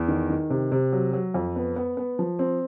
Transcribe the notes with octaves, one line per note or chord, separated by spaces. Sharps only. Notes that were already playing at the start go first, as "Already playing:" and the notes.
Already playing: E2
D#3
D#3
C3
C3
F#3
F#3
F2
B3
B3
B3
F3
C4